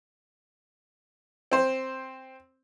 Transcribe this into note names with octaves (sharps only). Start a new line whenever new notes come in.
C4 C5